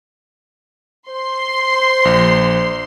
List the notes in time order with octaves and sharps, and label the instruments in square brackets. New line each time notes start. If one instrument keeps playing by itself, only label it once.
[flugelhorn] C5 [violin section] C6
[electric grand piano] A#1